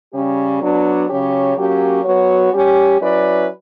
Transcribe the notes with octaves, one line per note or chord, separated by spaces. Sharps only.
C#3 G3 C#4 G4
F#3 B3 D4
C#3 F#3 C#4 G4 C#5
F#3 A#3 C#4 G4
F#3 B3 F#4 C#5
G3 C#4 G4
F#3 C#4 E4 B4 D5